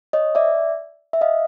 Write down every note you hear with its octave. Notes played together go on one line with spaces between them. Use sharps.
C#5 D#5
D5 E5
E5
D#5 F5